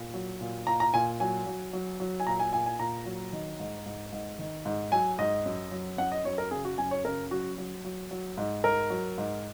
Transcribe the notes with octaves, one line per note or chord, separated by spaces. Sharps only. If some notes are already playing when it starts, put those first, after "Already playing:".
Already playing: A#2
F#3
A#2
A#2 A#5
A#5
A#2 G#5
F#3 G#5
F#3
F#3
F#3
G#5
A#2 A#5
G#5
A#2 G#5
G#5
A#2 A#5
F#3
D#3
G#2
G#2
G#2
D#3
G#2
F#3 G#5
G#2 D#5
F#2
F#3
F#2 F#5
D#5
F#2 C#5
A#4
C#3 G#4
F#4
F#2 G#5
C#5
C#3 A#4
F#3 F#4
F#3
F#3
F#3
G#2
G#2 A#4
F#3
G#2